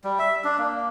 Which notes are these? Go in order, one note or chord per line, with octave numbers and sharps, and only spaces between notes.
G3
E5
D4
A#3